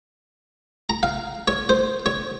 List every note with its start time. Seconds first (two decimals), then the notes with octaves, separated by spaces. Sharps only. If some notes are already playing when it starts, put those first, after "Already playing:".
0.90 A#5
1.03 F5
1.48 C#5
1.69 C5
2.06 C#5